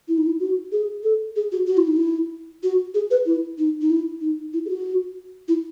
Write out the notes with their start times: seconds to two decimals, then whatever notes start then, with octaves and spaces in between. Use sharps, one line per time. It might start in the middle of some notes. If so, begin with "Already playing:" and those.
0.08 E4
0.18 D#4
0.26 E4
0.40 F#4
0.72 G#4
1.04 A4
1.36 G#4
1.52 F#4
1.67 F#4
1.77 E4
1.87 D#4
1.97 E4
2.63 F#4
2.94 G#4
3.11 B4
3.26 E4
3.58 D#4
3.81 D#4
3.90 E4
4.22 D#4
4.53 E4
4.65 G#4
4.69 F#4
5.48 E4